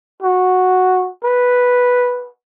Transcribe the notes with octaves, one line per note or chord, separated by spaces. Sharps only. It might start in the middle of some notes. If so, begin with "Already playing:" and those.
F#4
B4